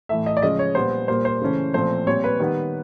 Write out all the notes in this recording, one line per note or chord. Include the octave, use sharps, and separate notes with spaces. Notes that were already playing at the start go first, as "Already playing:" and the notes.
A2 E3 A3 E5
D#5
D5
C#3 F3 G#3 C#4 D#5
C#5
A#2 G3 B3 C5
A#2 G3 A#3 C5
C5
C#3 E3 A3 C#4
A#2 F3 A3 C4 C5
A#2 G3 C4 C#5
B4
D#3 G3 B3